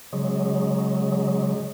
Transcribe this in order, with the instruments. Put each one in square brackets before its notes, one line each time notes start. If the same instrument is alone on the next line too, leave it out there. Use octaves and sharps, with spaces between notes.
[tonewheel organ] C#3 F#3 G#3